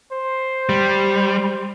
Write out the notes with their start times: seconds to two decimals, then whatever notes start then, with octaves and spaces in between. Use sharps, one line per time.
0.13 C5
0.69 G3